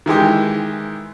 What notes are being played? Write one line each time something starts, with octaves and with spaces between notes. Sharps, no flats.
D#3 E3 G#3 G4